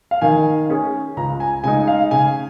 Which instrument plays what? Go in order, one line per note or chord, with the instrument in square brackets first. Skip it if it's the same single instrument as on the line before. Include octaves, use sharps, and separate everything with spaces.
[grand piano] F5
[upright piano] D#3 [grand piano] G#5
[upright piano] C#4 G#4
[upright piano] C#2 [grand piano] A#5
[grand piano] G#5
[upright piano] C#3 G#3 D#4 [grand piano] G#5
[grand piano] F5
[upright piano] C#3 [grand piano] G#5